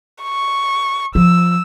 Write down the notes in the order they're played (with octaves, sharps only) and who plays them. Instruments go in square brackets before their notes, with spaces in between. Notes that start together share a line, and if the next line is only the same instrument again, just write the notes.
[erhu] C#6
[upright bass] F3 [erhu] E6